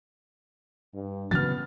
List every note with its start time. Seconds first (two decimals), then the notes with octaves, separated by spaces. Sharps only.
0.94 G2
1.31 C#3 E3 F#3 B3 F6 A6